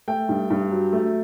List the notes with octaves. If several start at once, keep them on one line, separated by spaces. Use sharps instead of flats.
A3 G5
G2
G2
F#3
A3